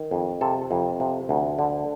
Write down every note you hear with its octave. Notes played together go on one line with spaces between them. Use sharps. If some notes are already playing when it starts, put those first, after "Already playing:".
Already playing: D#3
F2
C3 A4
F2
C3
D2
D3